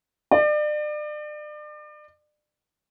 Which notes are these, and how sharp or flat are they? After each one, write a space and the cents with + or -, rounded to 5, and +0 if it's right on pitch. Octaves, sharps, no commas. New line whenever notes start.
D5 +35